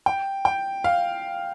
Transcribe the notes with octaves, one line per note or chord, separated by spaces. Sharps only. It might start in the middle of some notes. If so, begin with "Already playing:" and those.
G5
G5
F5